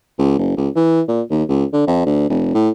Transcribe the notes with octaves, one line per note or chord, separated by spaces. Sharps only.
C#2
F#1
C#2
E3
A#2
D#2
C#2
D3
F2
D2
F1
A2